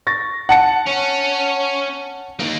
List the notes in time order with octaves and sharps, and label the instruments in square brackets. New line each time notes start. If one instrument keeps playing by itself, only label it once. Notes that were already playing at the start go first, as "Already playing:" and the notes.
[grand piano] C#6 A6 A#6
F#5 A5 C#7
[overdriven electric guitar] C#4
A#3 D#4